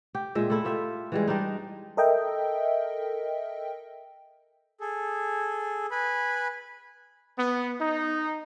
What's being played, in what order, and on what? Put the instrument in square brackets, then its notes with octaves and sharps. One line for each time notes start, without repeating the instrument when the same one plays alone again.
[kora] G4
A#2 G#3 E5
A3 E4 E5
F4 G4 E5
E3 G3 G#3
G3 D4 D#4
[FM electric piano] A4 A#4 D#5 E5 G5
[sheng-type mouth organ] G#4 A4
B4 G#5 B5
[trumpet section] B3
D#4